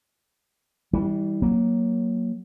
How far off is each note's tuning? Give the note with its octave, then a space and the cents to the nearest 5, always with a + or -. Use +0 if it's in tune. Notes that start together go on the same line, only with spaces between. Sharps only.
E3 -35 G3 +0
F#3 +0 A#3 +0